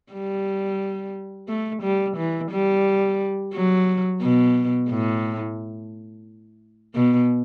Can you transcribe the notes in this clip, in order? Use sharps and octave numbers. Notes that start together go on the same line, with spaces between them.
G3
A3
G3
E3
G3
F#3
B2
A2
B2